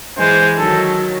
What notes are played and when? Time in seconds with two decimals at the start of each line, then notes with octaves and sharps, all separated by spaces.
0.18 E3 G#3 C5
0.58 D#3 F#3 A4